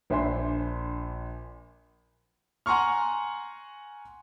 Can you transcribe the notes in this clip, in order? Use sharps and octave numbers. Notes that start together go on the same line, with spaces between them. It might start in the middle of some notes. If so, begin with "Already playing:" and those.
A#1 D4 C5 E5 G#5 C6
F#5 G#5 A#5 C6 C#6 F6